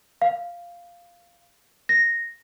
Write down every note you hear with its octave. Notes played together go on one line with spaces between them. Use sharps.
F5
A#6